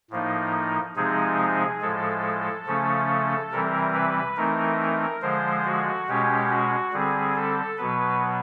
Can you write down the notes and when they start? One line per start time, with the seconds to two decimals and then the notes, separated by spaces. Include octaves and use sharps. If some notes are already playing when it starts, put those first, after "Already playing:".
0.10 A2 F3 A#3 D#4
0.96 C3 F3 G#3 C4 D#4 G#4
1.81 A2 F3 G#3 A4
2.66 C#3 F3 A3 C#4
3.52 C3 E3 G3 C4 A#4
3.94 B4
4.37 E3 A3 C4 D#4 A#4
5.22 D3 F3 G#3 C5
5.65 F#4
6.07 B2 G#3 C#4 G4
6.50 F#4
6.93 D3 G3 C4 G#4
7.36 A4
7.78 B2 F#3 B3 B4